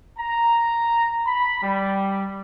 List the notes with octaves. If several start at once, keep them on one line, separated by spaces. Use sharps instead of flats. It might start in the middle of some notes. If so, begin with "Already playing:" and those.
A#5
B5
G3